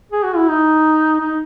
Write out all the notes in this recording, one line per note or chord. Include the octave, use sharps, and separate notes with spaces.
G#4
F#4
E4
D#4
D#4